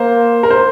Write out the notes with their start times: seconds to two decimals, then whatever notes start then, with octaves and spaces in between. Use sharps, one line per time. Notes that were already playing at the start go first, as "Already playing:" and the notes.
Already playing: A#3 C5
0.43 A#4
0.50 C5